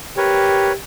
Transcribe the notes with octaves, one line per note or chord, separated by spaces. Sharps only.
G4 A#4 B4 C#5